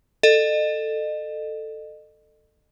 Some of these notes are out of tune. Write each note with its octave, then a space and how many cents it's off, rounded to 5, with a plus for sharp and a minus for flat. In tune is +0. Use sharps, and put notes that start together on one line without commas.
A4 +10 D#5 -35